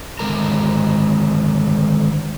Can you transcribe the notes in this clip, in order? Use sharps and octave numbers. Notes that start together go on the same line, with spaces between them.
D3 D#3 G#3 A#4 A#5